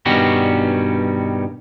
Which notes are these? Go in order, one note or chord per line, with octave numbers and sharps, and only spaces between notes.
G2 B2 D#3 G3 C#4 F#4